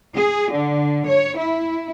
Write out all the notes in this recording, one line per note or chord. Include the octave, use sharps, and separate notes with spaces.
G#4
D3
C#5
E4